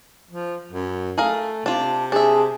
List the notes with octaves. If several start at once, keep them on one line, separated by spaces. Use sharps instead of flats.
F3
F#2
A3 G#4 A#4 F5
C3 D4 F4
D4 G#4 E5